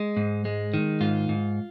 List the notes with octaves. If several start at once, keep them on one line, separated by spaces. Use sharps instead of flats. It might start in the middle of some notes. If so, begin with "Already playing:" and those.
Already playing: G#3
G#2
G#3
D#3
G#2 F4
G#2